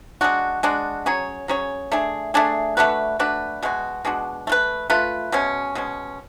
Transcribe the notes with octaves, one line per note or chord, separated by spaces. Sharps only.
G#3 D4 F#4
G#3 D4 F#4
F#3 C#4 G#4 C#5
F#3 C#4 G#4 C#5
A3 D4 G#4
A3 D4 G#4
A3 D4 F#4 B4
A3 D4 F#4 B4
B2 G#3 D4 F#4
B2 G#3 D4 F#4
A3 F4 B4
A3 F4 B4
B2 G#3 C#4
B2 G#3 C#4